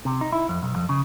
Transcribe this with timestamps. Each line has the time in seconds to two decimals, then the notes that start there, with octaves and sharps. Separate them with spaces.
0.05 C3
0.21 D#4
0.32 E4
0.49 F2
0.63 B1
0.76 F2
0.89 C#3